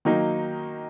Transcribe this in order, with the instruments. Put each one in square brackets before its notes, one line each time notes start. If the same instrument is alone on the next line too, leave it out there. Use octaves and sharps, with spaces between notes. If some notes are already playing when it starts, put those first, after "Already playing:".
[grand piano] D#3 F#3 A#3 D#4